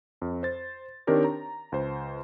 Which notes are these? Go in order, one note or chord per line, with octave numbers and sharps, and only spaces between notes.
F2
C5 A6
D#3 C4 D4 G4 A#4 C#5
A#5
C#2 C5